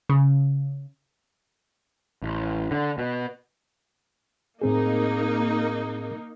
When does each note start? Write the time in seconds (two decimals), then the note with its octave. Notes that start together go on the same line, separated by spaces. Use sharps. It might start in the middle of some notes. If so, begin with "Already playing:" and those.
0.09 C#3
2.22 A1
2.71 D3
2.98 B2
4.62 A2 A#3 C4 D#4 G#4